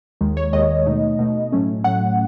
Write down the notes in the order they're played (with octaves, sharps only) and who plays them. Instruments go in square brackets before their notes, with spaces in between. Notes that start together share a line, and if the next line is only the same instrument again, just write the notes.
[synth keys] D#2 D#3 G#3
C#5
D#2 D#3 G#3 D#5
B2 A3 D#4
B2 A3 D#4
A2 F#3 A3 C#4
A2 F#3 A3 C#4 F#5